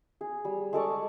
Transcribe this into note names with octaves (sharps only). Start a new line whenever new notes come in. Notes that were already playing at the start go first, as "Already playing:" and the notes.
G#4
G3
G#3 A4 D5 C#6